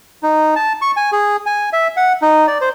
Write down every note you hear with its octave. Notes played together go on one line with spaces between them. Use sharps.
D#4
A5
C#6
G#5
G#4
G#5
E5
F#5
D#4
D5
C5